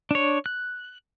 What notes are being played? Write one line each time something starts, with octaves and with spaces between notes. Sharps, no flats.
D4 C#5
F#6